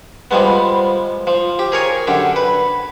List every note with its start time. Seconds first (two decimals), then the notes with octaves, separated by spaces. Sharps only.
0.31 F3 G3 G#3 B3
1.27 F3
1.59 G4
1.72 G#4 A#4 C#5 G#5
2.07 F#2 D3 G4
2.36 B4